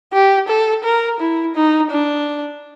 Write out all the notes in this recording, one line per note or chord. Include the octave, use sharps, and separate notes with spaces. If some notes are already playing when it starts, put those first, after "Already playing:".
G4
A4
A#4
E4
D#4
D4